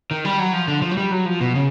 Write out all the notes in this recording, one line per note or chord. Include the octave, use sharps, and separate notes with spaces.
D#3
G3
F#3
F3
D3
F3
F#3
G3
F#3
F3
B2
C#3